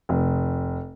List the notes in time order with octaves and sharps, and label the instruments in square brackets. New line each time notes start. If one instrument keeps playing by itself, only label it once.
[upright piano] F1